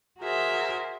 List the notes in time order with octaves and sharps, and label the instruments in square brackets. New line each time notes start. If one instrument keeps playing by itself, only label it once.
[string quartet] F#4 G#4 A#4 C5 E5